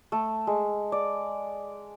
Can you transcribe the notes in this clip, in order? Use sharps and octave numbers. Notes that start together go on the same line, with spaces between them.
A3
G#3
D5